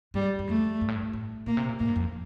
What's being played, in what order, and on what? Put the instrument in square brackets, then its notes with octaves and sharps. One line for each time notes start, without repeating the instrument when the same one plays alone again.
[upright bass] G2 [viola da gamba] G3
[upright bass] G2
[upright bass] F2 [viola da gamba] A3
[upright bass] G2
A2
G2
A2
[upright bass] A#2 [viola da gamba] A#3
[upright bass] C3
A#2
[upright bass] A2 [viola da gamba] A#3
[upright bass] G2
F2